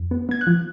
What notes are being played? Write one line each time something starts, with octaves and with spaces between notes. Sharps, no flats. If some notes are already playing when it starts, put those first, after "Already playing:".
Already playing: F2
B3
B3 G#6
F#6
F3